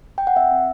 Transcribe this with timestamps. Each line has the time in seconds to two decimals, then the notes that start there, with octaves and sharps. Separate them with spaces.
0.18 G5
0.27 F#5
0.36 C4 E5
0.51 C4